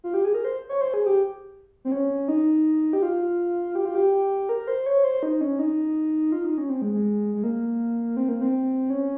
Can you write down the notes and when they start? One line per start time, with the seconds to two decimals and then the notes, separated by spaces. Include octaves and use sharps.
0.04 F4
0.14 G4
0.24 G#4
0.34 A#4
0.44 C5
0.69 C#5
0.81 C5
0.94 G#4
1.06 G4
1.85 C4
1.92 C#4
2.28 D#4
2.93 G4
3.02 F4
3.75 G4
3.85 F4
3.95 G4
4.49 A#4
4.67 C5
4.86 C#5
5.04 C5
5.23 D#4
5.41 C#4
5.59 D#4
6.32 F4
6.45 D#4
6.58 C#4
6.70 C4
6.82 G#3
6.94 G#3
7.35 G#3
7.43 A#3
8.17 C4
8.29 A#3
8.41 C4
8.90 C#4